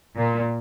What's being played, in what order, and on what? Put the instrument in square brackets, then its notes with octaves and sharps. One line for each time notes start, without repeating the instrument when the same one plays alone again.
[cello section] A#2